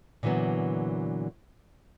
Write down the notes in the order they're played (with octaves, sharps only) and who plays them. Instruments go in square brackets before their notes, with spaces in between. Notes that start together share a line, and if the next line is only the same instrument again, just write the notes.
[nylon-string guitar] A#2 D3 E3 F#3 B3